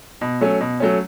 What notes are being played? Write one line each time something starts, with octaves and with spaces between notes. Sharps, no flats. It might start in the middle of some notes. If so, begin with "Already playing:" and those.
B2
F#3 A3 C#4
B2
F#3 A3 C#4